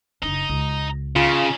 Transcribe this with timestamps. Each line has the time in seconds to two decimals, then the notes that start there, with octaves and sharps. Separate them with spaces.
0.22 F#1 D4 D#4
0.49 C#2
1.16 C#3 C#4 D#4 F4